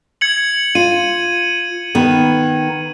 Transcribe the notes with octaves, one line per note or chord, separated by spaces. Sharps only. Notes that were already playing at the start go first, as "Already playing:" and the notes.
G#6 C#7 F#7
F4 D#7
D#3 B3